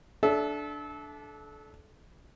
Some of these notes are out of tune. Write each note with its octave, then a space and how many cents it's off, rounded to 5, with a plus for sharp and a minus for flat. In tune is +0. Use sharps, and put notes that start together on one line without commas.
D4 +0 A4 -30 E5 +0